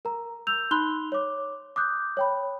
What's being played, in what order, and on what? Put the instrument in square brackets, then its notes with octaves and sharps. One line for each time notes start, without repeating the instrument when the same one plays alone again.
[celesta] A#4 A#5
E6 G6 F7
D#4 B5 C6 F#6 G7
C#5 D6
D6 D#6 F#6 G6
C#5 G5 B5